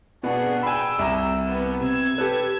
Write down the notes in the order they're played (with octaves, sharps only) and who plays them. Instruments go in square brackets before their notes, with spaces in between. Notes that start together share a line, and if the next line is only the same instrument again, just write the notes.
[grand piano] B2 B3 [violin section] D4 F#4 G#4
[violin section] G5 E6 [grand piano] G#5 B5
[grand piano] C2 A#5
[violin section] B3
[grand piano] C3 [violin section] E6 G#6
[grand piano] G4 A4 B4